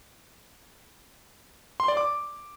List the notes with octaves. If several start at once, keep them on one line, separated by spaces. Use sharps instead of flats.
C6
D5
D6